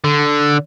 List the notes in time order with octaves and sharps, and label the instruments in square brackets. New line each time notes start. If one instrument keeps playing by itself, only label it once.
[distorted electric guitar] D3